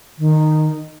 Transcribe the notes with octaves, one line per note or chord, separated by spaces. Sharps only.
D#3